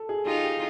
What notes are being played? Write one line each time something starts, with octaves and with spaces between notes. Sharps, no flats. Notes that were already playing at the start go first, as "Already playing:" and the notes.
Already playing: A4
G#4
D#4 F4 G4
G4